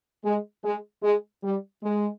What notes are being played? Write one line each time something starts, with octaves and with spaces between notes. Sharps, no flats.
G#3
G#3
G#3
G3
G#3